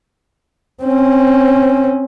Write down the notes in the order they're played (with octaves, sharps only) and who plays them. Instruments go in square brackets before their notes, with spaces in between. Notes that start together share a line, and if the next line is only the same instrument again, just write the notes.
[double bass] C4 C#4